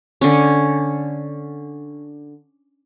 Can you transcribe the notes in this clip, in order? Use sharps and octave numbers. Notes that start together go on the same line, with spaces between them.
D3 C#4